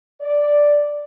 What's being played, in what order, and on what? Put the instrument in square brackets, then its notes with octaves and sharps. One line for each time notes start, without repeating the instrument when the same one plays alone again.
[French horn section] D5